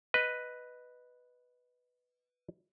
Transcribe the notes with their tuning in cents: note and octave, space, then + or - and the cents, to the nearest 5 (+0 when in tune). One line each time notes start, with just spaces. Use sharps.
B4 +0 D#5 +0